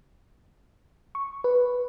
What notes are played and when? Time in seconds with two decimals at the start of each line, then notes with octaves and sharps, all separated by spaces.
1.15 C#6
1.44 B4